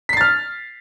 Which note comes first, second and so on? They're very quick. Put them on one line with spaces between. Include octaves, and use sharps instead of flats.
B6 C7 A6 F6